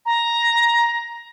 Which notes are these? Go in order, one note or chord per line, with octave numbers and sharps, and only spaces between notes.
A#5